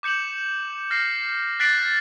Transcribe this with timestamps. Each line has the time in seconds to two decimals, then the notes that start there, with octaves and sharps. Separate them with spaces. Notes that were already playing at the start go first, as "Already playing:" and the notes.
0.03 D6 G6 C#7 E7 F#7
0.91 F6 A#6 C7
1.60 F#6 A6 B6 C7 D7 F#7